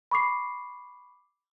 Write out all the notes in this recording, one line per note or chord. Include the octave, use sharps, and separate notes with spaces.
B5 C#6 D6 C7